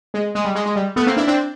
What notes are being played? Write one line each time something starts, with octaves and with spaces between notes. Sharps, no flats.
G#3
G#3
G3
G#3
G#3
G3
A3 B3
A#3 C4
D4 E4
C4 D4